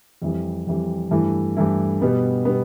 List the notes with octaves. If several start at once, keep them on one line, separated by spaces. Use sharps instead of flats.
F2 E3 G3
F2 E3 G3
G2 E3 A3 E4
G2 E3 A3 E4
B2 G3 B3
B2 G3 B3